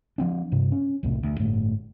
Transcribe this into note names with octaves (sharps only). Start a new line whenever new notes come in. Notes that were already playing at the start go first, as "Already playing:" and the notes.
F3 C4 D4
G2 C3
C#4
B1 E2 A2 C3
D2
G1 A2